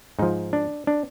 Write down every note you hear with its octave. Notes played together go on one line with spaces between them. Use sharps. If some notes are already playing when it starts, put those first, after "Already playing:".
G#2 F3 D#4
D4
D4